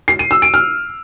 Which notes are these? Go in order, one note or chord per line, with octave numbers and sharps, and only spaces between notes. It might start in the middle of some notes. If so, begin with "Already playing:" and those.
C7
D#7
E6
D7
F6